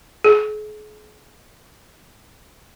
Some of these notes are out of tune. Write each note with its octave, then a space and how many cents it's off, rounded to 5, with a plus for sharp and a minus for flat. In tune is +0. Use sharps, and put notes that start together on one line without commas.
G#4 +40